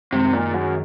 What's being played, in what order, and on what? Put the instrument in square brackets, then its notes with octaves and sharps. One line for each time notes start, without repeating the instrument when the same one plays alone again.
[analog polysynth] F#2 D#3 G#3 [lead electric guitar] C3
[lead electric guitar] A#2
F#2